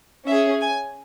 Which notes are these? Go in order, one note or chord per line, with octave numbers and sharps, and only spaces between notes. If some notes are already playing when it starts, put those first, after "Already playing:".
C#4 G#4 E5
G#5